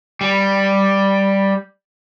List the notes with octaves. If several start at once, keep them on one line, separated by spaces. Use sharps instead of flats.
G3